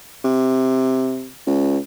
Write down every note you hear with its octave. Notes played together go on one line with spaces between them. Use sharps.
C3
C#2